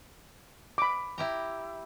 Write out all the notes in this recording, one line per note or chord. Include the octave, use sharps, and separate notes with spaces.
B5 D6
E4 G4 A#5